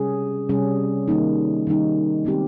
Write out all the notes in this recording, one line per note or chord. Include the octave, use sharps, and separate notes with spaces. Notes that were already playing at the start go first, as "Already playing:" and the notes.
Already playing: C3 G3 C#4 G#4
C3 G3 C#4 G#4
D#3 G3 A#3 D#4
D#3 G3 A#3 D#4
D#3 G#3 C4 G4